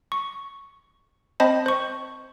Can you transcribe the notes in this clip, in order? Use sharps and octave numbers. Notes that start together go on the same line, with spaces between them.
C#6
C4 C5 D#5 A5 B5
C5 C#6